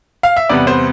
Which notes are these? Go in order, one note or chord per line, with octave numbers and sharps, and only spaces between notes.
F5
E5
E2 C3 G3 B3 D5
C5